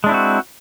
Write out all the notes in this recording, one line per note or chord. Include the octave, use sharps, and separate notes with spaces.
G#3 C4 D4 E4 F#4